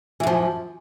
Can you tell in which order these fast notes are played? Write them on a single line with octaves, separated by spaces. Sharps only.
E3 F#2 F3